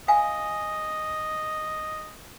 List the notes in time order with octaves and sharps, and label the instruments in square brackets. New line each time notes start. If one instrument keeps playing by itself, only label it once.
[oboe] D#5 [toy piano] F5 G#5